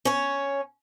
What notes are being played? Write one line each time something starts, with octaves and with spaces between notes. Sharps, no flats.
C#4 C#5